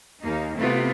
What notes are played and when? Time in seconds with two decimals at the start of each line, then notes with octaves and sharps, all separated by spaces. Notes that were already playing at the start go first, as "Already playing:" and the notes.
0.20 D#2 A#3 D#4
0.57 C3 A3 B3 E4 F4